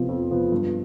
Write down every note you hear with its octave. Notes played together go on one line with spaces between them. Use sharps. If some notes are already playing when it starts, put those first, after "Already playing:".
Already playing: C3 F3 B3
F2
C3 F3 B3
G2